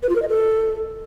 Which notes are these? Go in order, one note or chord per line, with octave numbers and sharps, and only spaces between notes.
B4
F4
A#4
D#5
A4